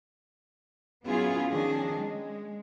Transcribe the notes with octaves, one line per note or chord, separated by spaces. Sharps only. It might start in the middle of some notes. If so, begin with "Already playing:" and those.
F#3 B3 C#4 E4 F4 G#4
D#3 F3 C#4 D4 G#4
G#3